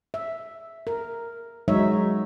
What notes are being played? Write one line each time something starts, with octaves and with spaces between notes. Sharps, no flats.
E5
A#4
F#3 G#3 D#4 C#5 E5